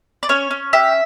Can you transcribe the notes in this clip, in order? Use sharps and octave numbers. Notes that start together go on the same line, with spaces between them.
D5
C#4 C#5
C#4
G4 E5